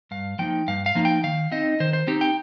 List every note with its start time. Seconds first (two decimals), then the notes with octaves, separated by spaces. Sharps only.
0.11 G2 F5
0.39 F3 A#3 D#4 G5
0.68 G2 F5
0.86 F5
0.95 F3 A#3 D#4
1.05 G5
1.24 D#3 F5
1.52 C4 D#4 D#5
1.80 D#3 C5
1.93 C5
2.07 C4 D#4 G4
2.21 G5